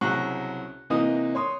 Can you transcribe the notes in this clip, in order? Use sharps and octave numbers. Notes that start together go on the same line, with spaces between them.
C2 C#3 F#3 C#6 F#6
C3 E3 A#3 D#4 D#6
C#5 C6 D#6